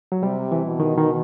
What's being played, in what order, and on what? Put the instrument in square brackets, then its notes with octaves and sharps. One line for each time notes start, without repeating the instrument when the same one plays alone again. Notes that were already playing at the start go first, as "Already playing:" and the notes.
[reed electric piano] F#3
[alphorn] C3 [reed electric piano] G3
[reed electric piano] E3
[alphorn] B2
[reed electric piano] D#3
D#3